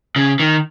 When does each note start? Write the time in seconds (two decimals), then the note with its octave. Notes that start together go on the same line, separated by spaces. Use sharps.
0.16 C#3
0.40 D#3